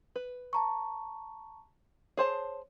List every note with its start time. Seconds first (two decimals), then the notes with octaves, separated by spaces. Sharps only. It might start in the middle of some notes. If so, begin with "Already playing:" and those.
0.16 B4
0.53 A5 A#5 C#6
2.17 G#4 C5 C#5 A5